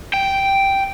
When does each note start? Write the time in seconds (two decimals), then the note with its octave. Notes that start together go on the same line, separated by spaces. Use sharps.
0.14 G5